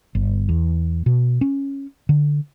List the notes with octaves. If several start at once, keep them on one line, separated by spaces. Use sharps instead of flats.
G1
E2
B2
C#4
D3